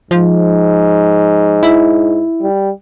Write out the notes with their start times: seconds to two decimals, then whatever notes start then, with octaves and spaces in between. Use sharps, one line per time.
0.11 G#2 F3
1.63 E4
2.42 G3